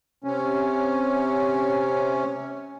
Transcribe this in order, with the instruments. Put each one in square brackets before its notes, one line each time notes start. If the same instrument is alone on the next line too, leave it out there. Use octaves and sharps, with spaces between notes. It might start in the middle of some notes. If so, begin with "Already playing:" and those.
[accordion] C3 C#4